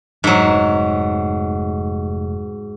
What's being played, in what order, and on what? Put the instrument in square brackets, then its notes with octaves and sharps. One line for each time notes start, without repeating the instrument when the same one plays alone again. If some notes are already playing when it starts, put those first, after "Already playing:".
[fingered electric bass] F1 [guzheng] G#2 F#3